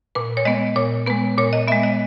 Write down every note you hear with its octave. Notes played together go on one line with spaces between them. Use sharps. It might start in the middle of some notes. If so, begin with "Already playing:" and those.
A#2 B4
C#5
G#3 B3 D#5
A#2 C#5
G#3 B3 B4
A#2 C#5
D#5
G#3 B3 E5
D#5